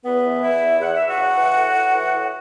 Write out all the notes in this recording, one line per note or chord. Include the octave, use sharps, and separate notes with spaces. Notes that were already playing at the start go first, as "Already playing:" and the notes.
E2 B3 B4
E3
E2 E4 E5
E2
E2 F#5
E2 E5
F#4 F#5
C#3
E3
A2
A2
E3
A2